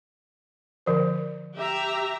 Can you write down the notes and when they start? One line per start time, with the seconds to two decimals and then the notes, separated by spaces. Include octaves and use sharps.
0.86 D3 F3 C5
1.57 G4 E5 A#5